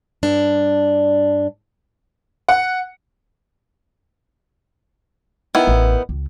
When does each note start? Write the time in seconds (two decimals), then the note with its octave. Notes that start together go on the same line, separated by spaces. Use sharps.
0.23 G2 D4
2.49 F#5
5.55 D#3 B3 E4
5.67 A1
6.09 C#2